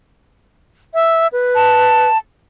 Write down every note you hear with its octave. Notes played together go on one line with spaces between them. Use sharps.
E5
B4
A5